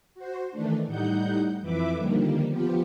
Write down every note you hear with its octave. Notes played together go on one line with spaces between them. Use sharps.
F#4 C5
D#3 E3 A3 D4
A2 G3 D#4 F#5 G6
F2 E3 B4 E5 D6
D3 D#3 F3 G3 A#3
F3 B3 F4 G4